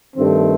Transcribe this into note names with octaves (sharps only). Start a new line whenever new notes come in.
G2 D#3 A3 C4